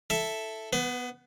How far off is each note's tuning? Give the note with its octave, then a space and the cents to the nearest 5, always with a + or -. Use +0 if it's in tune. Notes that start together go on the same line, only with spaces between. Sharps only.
E4 +0 A4 +0 E5 +0
B3 +0 B4 +40